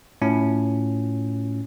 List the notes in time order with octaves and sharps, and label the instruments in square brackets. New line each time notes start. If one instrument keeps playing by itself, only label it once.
[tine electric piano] A2 C#4 F4